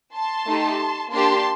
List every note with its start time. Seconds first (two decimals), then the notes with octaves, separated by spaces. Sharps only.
0.15 A5 C6
0.47 A3 D#4 G4
1.12 A#3 D4 G4 A5 C6